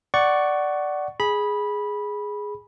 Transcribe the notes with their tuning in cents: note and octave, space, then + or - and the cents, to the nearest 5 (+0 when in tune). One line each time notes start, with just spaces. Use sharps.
D5 +0 F#5 +15 C#6 +0
G#4 +0 B5 -15